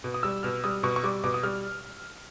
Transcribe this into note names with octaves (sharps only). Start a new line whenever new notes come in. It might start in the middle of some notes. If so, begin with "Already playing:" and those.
B2
D#6
G3 E6
B2 F6
G3 D#6
B2 C#6
C#6
G3 D6
B2 D6
D#6
G3 F6